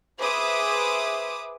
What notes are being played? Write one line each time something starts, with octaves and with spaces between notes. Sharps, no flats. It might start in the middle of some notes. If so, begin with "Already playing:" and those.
G#4 B4 C5 E5 D6 D#6